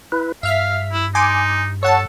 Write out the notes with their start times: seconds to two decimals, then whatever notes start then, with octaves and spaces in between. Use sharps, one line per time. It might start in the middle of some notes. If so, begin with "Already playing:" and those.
0.12 E4 B4
0.43 G2 E5 F5 F6 B6
0.92 E4
1.15 D#4 G#5 C6 D6
1.83 A4 C#5 F#5 A5